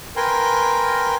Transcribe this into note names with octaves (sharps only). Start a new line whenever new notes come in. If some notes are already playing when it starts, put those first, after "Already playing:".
A#4 B4 G5 G#5 C6